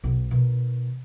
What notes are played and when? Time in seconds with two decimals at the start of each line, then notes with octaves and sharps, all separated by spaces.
0.04 B1
0.31 B2 D#3